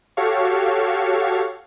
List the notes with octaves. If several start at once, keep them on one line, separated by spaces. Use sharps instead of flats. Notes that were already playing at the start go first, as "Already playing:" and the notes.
F#4 G4 A4 C#5 F5 C#6